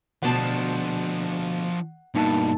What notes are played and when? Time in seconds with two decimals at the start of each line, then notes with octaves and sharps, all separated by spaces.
0.22 D2 B2 F3 D4 F#5 A5
2.15 G2 B2 A#3 D#4 A5